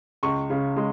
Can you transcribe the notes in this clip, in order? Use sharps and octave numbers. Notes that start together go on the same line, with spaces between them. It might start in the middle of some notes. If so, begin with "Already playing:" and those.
C#2 C#6
C#3
G#3